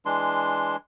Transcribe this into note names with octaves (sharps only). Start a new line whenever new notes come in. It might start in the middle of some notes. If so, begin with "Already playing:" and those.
E3 G#3 D4 C6